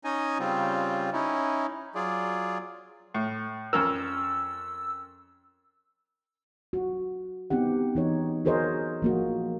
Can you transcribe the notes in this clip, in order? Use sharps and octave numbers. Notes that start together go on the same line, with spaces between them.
C#4 D#4 D#5 G#5
C#3 G3 C4 F4
C#4 D#4 E4
F#3 F4 G#4 D5
A2
F2 C#4 A#4 E6
F#4
B3 C4 D#4 G4 F#5
E3 D#4 C#5
F#4 G#4 A#4 C5 C#5 D#5
F3 A#3 F#4